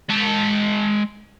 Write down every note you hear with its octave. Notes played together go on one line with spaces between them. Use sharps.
G#3 A5